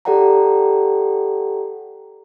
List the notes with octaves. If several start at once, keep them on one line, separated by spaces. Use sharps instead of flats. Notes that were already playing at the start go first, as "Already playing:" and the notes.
G4 A4 D5 F#5 G5 A#5